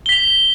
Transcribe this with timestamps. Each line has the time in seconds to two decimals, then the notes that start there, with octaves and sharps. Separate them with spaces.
0.06 G7
0.09 B6
0.12 F7